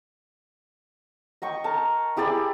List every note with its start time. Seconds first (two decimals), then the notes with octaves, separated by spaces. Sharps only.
1.42 D#5 G5 C#6
1.64 A#4 A5
2.17 E4 G4 G#4 D5